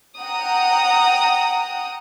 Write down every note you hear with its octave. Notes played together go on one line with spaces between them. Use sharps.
F#5 G5 A#5 D#6